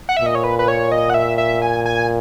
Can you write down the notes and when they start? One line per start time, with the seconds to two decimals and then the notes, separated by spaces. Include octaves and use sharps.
0.09 F#5
0.17 E5
0.21 A#2
0.26 D#5
0.35 C#5
0.44 B4
0.59 B4
0.68 C#5
0.92 D#5
1.10 F#5
1.14 E5
1.38 E5
1.62 G#5
1.86 G#5